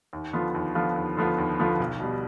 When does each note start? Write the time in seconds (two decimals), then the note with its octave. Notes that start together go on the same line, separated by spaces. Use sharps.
0.13 D#2
0.33 D3 F3 B3 F4
0.55 D#2
0.75 D3 F3 B3 F4
0.96 D#2
1.17 D3 F3 B3 F4
1.38 D#2
1.59 D3 F3 B3 F4
1.80 B1
2.00 B2 G3